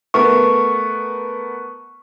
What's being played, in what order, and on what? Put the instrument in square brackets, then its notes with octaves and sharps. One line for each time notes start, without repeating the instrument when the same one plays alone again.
[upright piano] A3 B3 A#4 [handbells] C#6